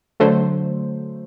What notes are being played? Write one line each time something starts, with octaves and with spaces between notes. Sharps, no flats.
D3 F#3 A3 C5